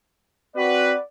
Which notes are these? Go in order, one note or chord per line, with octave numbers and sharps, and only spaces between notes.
C4 F#4 B4 D5